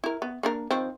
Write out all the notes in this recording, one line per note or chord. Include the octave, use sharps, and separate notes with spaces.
E4 A#4
B3
A#3 D4 A#4
D#3 F3 C4